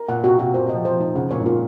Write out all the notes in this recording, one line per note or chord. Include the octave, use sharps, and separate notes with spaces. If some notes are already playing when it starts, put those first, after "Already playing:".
Already playing: A#4
A#2 F#5
C3 F#4
C3 F#4
A#2 C5
C3 D#5
F3
F3 C5
F3 D#4
C#3 F#5
A#2 C#5
G#2
A#2 F4